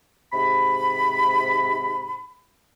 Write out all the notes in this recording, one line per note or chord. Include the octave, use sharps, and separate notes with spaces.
G#2 C3 B5